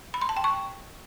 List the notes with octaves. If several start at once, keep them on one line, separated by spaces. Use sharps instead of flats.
B5
C6
A5
G5
C#6